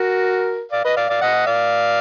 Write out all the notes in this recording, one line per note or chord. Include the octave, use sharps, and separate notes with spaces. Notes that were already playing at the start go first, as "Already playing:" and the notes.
Already playing: F#4 A#4
D5 F5
B4 D#5
D5 F5
D5 F5
D#5 F#5
D5 F5